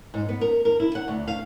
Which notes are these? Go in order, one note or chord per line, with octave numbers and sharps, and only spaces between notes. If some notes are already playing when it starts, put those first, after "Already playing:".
G#2
B3
A#4
A#4
E4
F#5
D2
F5